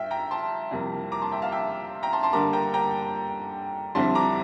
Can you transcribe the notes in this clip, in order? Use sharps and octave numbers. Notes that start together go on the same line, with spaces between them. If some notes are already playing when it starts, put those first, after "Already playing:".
Already playing: G2 E5 G5
G5 A#5
A5 C6
F2 C3 G3 A#3 E4
A#5 D6
A5 C6
E5 G5
F5 A5
E5 G5
G5 A#5
A5 C6
A5 C6
D3 G3 A#3 A#5 D6
G5 A#5
G5 A#5
F2 D3 G3 C4 E4 A5 C6
A#5 D6